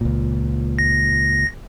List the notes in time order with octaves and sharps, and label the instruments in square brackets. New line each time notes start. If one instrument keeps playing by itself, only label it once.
[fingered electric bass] C#2 A#2
[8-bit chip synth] A#6